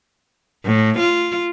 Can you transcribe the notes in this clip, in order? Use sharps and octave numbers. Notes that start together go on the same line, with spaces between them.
A2
F4